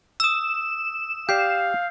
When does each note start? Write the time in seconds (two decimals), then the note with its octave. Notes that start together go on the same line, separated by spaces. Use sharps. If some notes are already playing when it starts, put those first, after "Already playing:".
0.20 D#6 E6 E7
1.29 G4 D5 F5 G6 C7